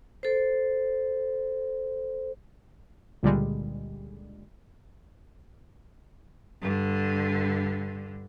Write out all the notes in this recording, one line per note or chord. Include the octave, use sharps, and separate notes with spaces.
A4 C5
C#2 A#2 D3 G3 G#3
G2 D3